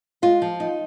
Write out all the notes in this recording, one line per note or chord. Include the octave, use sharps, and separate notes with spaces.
G#3 F4
F3
D#4